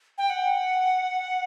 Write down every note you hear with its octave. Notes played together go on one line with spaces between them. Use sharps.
G5
F#5